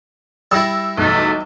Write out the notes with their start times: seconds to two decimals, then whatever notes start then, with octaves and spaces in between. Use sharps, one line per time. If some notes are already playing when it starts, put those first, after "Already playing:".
0.51 G3 E4 E6 A6 A#6
0.97 B1 E2 A3